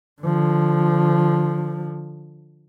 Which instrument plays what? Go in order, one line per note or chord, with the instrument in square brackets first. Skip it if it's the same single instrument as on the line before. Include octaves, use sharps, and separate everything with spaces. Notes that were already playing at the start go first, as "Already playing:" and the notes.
[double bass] D3 F3